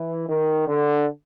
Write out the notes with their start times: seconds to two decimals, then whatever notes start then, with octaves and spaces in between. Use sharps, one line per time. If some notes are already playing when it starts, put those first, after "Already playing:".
Already playing: E3
0.29 D#3
0.67 D3